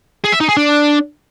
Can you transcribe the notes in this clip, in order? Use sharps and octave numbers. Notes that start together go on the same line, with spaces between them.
G#4
E5
D#4
G#4
D4